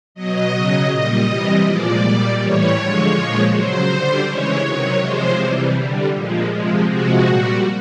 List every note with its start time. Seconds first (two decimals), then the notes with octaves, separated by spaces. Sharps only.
0.15 B2 F#3 D#5
0.52 C#3 F#3
0.89 A#2 G3 D#5
1.27 C3 E3 G3
1.64 A#2 F3 G#3 D5
2.01 A#2 G3
2.38 A2 E3 G3 C#5
2.76 D3 F3 G#3
3.14 A#2 F3 G#3
3.51 C#3 F#3 C5
3.88 D3 G3
4.26 C#3 E3 G#3 C#5
4.63 C3 D#3 F#3 C#5
5.01 C3 F3 G#3 C5
5.38 C3 E3 G3
5.76 D3 G3
6.13 A#2 F3 G#3
6.51 C3 F3 G#3
6.88 C3 F3 G#3 F#4
7.25 A#2 G3